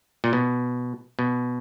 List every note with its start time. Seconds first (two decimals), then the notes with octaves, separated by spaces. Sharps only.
0.24 A#2
0.33 B2
1.19 B2